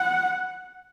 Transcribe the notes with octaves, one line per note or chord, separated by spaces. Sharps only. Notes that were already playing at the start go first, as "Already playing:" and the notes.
Already playing: F#5